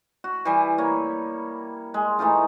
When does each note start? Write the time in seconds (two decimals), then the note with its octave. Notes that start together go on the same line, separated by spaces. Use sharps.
0.24 F#4
0.45 E3 G3 G#5
0.78 A#3 C#5
1.94 G#3
2.19 E3 A3 D#4 F4